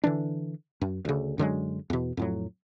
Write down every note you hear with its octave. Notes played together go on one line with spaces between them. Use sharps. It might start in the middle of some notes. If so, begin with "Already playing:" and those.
D3 E3 D4
F#2
D2 C#3
F#2 D3 F#3 G#3
E2 B2
F2 A2 F#3